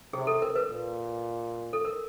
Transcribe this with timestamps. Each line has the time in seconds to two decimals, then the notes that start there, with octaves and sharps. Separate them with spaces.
0.13 C3 G#4
0.27 A4
0.42 A#4
0.56 B4
0.70 A#2
1.73 A4
1.85 A#4